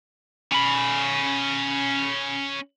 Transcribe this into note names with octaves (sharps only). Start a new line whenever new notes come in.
C#4 B5